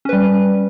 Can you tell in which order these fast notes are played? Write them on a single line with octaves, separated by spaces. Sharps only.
C#4 B4 G3